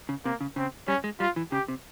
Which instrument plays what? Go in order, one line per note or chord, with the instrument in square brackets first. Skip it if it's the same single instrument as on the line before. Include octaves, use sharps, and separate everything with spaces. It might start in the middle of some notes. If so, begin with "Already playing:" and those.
[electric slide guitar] C#3
[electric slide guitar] C3 [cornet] A#3
[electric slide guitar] C#3
[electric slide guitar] C#3 [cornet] C4
[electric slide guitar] G3 [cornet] C#4
[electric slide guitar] G#3
[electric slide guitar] G3 [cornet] F4
[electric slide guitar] E3
[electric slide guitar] C#3 [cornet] G4
[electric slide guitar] C3